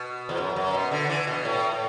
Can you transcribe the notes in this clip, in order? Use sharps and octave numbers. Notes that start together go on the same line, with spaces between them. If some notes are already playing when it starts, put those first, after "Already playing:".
Already playing: B2
E2
F#2
F#2
B2
D3
E3
B2
A2
A2